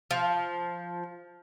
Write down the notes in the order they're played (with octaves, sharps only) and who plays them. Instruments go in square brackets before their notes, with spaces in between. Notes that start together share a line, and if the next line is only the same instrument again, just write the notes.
[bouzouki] F3